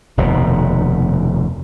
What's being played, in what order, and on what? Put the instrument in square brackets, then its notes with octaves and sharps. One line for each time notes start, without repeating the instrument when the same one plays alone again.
[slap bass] F1 D#2 B2